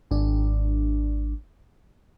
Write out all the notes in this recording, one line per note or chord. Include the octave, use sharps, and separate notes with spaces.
G#1 D4